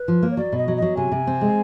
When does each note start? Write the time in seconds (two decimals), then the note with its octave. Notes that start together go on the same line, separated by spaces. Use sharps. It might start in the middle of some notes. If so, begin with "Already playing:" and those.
Already playing: B4
0.08 F3
0.23 A#3
0.31 C#5
0.37 F#3 D5
0.52 B2
0.58 D#5
0.68 F#3
0.77 D#5
0.82 F#3
0.97 C3 G#5
1.12 C3
1.27 C4
1.41 G#3